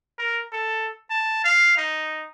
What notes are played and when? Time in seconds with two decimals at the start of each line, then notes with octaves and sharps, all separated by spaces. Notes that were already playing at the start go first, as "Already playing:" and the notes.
0.18 A#4
0.52 A4
1.10 A5
1.44 F5
1.77 D#4